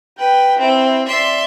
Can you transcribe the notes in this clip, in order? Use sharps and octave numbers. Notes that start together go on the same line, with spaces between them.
B4 G5
C4 E4
D5 E5 C6